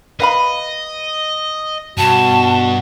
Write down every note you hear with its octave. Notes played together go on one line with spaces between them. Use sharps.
B4 D#5 F5 B5
G2 B2 F#4 A5